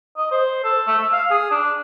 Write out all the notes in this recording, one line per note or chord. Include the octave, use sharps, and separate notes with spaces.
D#5
C5
A4
A3
E5
F5
G#4
D4